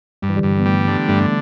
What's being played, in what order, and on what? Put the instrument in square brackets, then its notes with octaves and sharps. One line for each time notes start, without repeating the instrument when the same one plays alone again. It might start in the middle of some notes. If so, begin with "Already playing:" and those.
[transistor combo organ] G2 [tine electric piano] G3
[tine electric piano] E3
D3 G3
[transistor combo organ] G2
[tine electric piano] B3
[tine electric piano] E3 A3 [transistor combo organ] G3
[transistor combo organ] D3
[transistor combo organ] G2 [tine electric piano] A3 D4